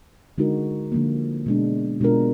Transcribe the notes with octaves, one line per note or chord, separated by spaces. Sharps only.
D3 G#3 D#4 F#4 A#4
D3 F3 A#3
B2 G#3 D4
B2 G#3 D4 F4 A#4